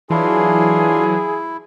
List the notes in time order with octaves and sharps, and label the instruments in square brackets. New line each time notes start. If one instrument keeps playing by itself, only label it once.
[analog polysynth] E3 F#3 [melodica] D4 F4 C6 [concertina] E4 [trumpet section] G#4